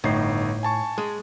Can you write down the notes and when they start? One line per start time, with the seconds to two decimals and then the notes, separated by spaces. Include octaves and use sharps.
0.04 G1 A2 D#4 C7
0.63 G#5 A5 C#6
0.98 G#3